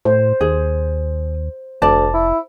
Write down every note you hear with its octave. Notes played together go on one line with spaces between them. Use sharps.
A2 C5
D#2 G#4
F1 D2 D5 A5
E4